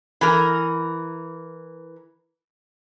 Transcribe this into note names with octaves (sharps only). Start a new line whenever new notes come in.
E3 A#4